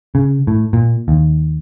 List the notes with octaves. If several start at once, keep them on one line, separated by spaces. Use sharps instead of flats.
C#3
A2
A#2
D#2